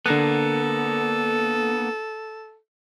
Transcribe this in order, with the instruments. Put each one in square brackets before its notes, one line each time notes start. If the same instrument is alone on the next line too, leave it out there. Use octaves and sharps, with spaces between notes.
[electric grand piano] D3 F#6 [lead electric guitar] A#3 B3 [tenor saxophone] A4